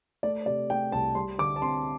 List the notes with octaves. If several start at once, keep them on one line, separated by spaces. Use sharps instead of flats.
A3 D5
C3 D5
A3 G5
C2 A5
G3 C6
D3 D6
A5
C4 C6